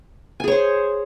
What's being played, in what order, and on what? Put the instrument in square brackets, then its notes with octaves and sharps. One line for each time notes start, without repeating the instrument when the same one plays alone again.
[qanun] G#5
G#4
C#5
C5